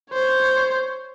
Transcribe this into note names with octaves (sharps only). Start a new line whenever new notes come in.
C5 C#5